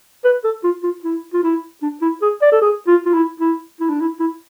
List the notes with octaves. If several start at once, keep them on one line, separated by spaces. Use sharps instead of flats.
B4
A4
F4
F4
E4
F4
E4
D4
E4
G#4
D5
A4
G#4
F4
F4
E4
E4
E4
D4
E4
E4